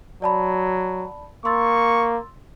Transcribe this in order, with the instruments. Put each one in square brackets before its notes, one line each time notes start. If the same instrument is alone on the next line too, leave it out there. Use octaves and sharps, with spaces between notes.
[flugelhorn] F#3 [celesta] D5 A5 B5
[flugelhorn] A#3 [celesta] C6 E6 A6 [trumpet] C#6